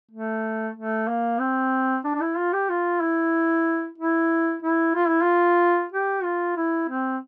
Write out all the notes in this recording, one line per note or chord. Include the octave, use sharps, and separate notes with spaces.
A3
A3
A#3
C4
D4
D4
E4
F4
G4
F4
E4
E4
E4
F4
E4
F4
G4
F4
E4
C4